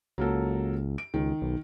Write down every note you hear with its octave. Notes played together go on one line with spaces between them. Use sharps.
C#2 F#3 A#3 A4
D7
C#2 D#3
B1